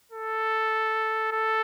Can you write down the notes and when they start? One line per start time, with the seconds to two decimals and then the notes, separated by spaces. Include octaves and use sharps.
0.12 A4
1.32 A4